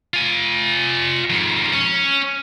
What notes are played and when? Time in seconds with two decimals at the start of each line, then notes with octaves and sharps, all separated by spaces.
0.14 F4 G#5
1.30 F2 G#2
1.73 C#4